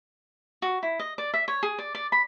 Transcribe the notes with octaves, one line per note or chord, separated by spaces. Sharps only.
F#4
E4
D#5
D5
E5
C#5
G#4
D5
D5
B5